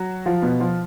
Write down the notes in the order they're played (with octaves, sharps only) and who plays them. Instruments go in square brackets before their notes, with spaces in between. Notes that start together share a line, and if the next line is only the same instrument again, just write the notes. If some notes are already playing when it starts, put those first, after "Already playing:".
Already playing: [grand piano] F#3 F#4
F3 F4
B2 B3
F3 F4